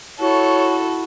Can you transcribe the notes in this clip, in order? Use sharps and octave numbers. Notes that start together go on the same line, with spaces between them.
E4 F#4 A4 C#5